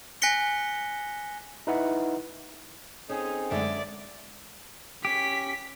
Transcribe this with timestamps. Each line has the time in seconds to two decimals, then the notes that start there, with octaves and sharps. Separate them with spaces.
0.22 G#5 F#6 A#6 B6 C#7 G7
1.67 D#4 E4 B4 E5 F#5
3.09 C4 C#4 D#4 G#4 A4
3.51 F#2 D3 G#3 D5 E5
5.05 C#4 G4 B6